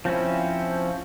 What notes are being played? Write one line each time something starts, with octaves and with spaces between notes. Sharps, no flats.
F3 C4 C#4 E4